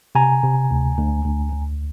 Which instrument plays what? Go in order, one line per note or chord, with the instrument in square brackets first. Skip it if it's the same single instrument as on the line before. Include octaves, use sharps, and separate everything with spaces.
[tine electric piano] C3 G#5 A#5
C3
D2
D2
D2
D2